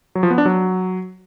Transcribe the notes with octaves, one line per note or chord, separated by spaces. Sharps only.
F#3
F3
B3
D4
F#3